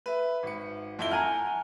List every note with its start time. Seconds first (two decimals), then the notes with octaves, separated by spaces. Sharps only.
0.06 B4 E5
0.43 G#1 C#7
0.99 F2 E4 G7
1.11 F#5 G#5 A#5 F6